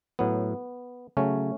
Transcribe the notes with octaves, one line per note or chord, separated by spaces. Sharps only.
A2 F#3 B3
C#3 F#3 A3 C#4